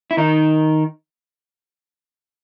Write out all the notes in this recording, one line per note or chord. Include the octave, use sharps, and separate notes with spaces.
E4
D#3 D#4